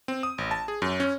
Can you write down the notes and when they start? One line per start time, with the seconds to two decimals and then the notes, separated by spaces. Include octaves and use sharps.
0.08 C4
0.23 D#6
0.38 A1
0.51 A5
0.68 G#4
0.82 F#2
1.00 C#4